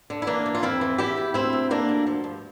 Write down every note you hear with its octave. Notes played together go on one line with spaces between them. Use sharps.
D3
E4
E3 A#3 D4
E3
F4
F2 C4 E4
E3
E2 E4 G4
E2
D2 C4 E4
C3
D3 A#3 D4
D2
F3
G2